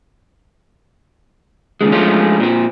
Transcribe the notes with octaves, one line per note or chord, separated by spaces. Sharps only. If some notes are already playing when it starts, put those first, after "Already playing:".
D#2 G#2 C#3 G#3
F3 G#3 A3 C#4 D4 F4
A#2 C4